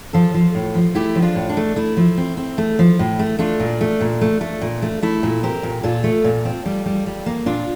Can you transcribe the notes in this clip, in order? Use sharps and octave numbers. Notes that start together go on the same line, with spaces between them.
F3 F4 A4
F3
A2
F3
A3 E4 G4
F3
D4 F4
A2
D4
A3
A3 E4
F3
C4
C4
A3
F3
A2
A3
A3 D4 F4
A#2
A3
A#2
A3
A3
A#2
A3
A3 E4
A#2
C4 G4 A#4
A#2
A#2 F4 A4
A3
A#2
C4
G3
G3
G3
A#3
A#2 D4 F4